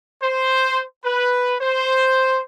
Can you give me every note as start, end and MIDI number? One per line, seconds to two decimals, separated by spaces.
0.21 0.83 72
1.05 1.56 71
1.60 2.41 72